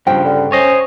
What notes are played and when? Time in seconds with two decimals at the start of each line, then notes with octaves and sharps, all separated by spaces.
0.07 G2 C#3 F3 G5
0.25 D3
0.52 C#4 C5 C#5 D#5